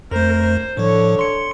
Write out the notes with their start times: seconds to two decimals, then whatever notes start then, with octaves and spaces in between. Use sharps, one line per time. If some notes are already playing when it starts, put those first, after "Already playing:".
0.11 F2 A3 A#4 C5
0.42 C5
0.77 A2 D3 F3 C#5
1.19 C6 C#7